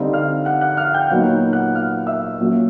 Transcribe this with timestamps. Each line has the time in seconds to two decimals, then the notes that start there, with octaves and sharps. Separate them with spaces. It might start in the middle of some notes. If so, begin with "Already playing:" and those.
Already playing: D3 G3 C4 D#4 F5
0.13 F5 F6
0.45 F#5 F#6
0.61 F#5 F#6
0.77 F5 F6
0.94 G5 G6
1.10 A#2 F#3 B3 D#4 F#5 F#6
1.53 F#5 F#6
1.74 F5 F6
2.07 E5 E6
2.40 A#2 F#3 A#3 C#4